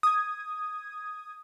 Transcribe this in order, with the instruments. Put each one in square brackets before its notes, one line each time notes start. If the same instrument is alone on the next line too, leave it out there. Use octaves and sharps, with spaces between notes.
[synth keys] D#6 G#6